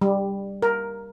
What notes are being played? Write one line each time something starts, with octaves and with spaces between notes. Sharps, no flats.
G3
A#4